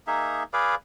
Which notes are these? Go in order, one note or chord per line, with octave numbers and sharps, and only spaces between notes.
A#3 D#4 G#4 E5
G#4 B4 D5 F5